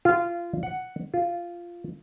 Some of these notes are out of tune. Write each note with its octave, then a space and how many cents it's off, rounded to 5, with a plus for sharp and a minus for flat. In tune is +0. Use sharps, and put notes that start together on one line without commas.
F4 -20
F#5 +5
F4 -10